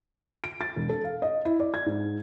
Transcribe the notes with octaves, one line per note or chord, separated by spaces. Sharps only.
D7
A6
E1
A4
F5
D#5
E4
D5
G#6
G#2